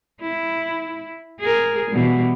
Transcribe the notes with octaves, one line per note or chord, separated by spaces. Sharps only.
E4
G#4 A#4
B2 E3 G3